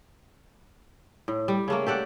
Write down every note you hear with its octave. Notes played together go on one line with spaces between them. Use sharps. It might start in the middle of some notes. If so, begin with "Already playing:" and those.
A2
G3
C#3 A3 A#3
G4 A4 D5 F#5